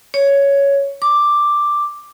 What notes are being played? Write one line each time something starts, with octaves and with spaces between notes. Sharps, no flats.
C#5
D6